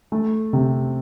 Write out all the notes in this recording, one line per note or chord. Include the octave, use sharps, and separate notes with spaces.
A3
C3